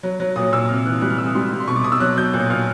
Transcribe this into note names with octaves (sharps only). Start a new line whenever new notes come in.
F#3
F#3
A#2 D#6
A#2 E6
C3 F6
E3 F#6
G3 F#6
F6
C3 E6
D#6
G3 C6
G3
C6
B2 C#6
D6
B2 D#6
E6
F#3 F#6
F#3 G6
A#2 F#6
A#2 F6